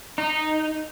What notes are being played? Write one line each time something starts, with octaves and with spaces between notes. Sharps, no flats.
D#4